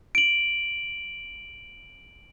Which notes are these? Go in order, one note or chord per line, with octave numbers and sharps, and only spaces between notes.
D7 F#7